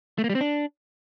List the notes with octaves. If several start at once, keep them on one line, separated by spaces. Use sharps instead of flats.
A3
A#3
G3
C4
D4